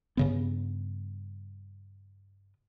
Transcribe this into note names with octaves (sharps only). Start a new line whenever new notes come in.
G2 C#3 B3